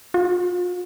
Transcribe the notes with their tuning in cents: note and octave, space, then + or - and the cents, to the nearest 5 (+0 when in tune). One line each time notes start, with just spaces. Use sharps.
F4 +35